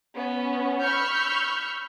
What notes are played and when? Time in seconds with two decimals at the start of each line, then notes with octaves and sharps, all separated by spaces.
0.16 B3 C#4
0.80 B5 C#6 E6 F6 G6